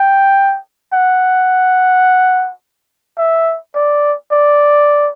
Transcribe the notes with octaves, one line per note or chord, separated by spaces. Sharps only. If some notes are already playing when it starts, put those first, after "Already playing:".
Already playing: G5
F#5
E5
D5
D5